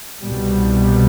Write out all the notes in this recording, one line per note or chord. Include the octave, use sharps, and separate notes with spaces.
C2 B2 G3